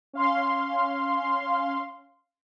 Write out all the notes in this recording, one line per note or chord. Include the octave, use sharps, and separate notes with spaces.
C#4 F5 C6